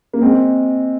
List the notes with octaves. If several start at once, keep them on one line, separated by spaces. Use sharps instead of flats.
A#3
G#3 C4